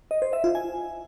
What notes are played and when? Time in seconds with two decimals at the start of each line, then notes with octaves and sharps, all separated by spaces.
0.11 D#5
0.22 C5
0.33 E5
0.44 F4
0.55 G#5